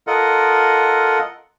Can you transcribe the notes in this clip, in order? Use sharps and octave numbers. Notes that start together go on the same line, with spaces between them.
F4 A4 A#4 D#5 F#5